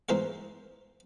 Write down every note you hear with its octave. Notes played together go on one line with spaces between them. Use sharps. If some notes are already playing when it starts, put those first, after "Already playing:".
G#2 E3 A#4 C5 F5